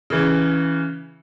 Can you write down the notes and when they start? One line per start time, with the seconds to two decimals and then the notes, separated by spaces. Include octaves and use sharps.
0.10 C#3 E3